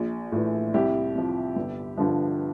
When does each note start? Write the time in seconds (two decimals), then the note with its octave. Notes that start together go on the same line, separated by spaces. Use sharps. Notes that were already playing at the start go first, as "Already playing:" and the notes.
Already playing: A#1
0.32 A2 E3
0.74 C2 E4 G4
1.16 C3 F3
1.56 G1
1.97 G2 D3 F3